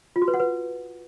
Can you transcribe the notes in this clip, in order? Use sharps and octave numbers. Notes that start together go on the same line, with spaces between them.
F4
F#4
B4
F#5
B4